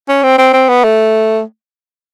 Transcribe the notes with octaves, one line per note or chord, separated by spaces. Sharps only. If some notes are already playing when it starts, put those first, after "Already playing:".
C#4
C4
C4
C4
B3
A3